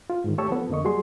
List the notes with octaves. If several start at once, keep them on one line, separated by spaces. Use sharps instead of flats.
F4
G#2 D#3
A3 G4 C#5 A5 C#6 E6
F3 B3 A4
F2 D3 A#3 D#5 C#6
F#3 G3 F#4 G#4 C6